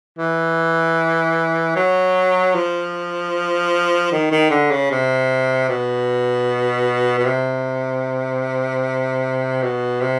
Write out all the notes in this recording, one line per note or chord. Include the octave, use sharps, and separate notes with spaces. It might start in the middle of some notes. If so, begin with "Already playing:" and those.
E3
F#3
F3
D#3
D#3
D3
C#3
C3
B2
B2
C3
B2
C3